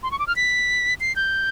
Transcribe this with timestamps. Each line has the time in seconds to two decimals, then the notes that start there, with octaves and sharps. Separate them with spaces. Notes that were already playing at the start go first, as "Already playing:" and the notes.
0.03 C6
0.11 C#6
0.19 D6
0.27 F6
0.36 B6
1.00 C7
1.16 G6